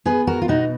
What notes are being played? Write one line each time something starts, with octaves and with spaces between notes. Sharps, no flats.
B3 G#4 B4
F#4 A#4
F4
B2 D#4 F#4